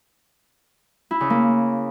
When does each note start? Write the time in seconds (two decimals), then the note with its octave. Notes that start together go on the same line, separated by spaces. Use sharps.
1.11 E4
1.20 C#3
1.30 A#3